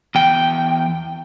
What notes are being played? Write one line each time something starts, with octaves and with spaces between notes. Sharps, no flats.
E2 G5